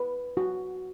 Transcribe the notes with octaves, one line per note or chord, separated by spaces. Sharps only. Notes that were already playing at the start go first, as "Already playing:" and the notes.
Already playing: B4
F#4